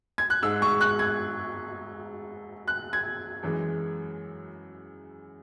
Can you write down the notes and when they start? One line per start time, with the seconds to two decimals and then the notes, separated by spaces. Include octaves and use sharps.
0.18 G#6
0.30 F#6
0.42 G#2 G#3 E6
0.62 C#6
0.81 F#6
0.99 G#6
2.68 F#6
2.93 G#6
3.43 F#2 E3 G#3